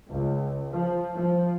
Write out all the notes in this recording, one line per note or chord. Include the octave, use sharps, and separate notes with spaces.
C#2
F3
F3